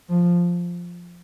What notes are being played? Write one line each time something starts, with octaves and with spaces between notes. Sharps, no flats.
F3